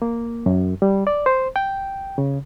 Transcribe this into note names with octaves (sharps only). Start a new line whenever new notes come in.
A#3
F#2
G3
D5
C5
G5
C#3